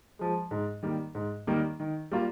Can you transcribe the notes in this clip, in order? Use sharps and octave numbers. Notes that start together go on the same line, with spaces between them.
F3 G#3
G#2
D#3 G3 A#3
G#2
D#3 G3 A#3
D#3
G3 A#3 F4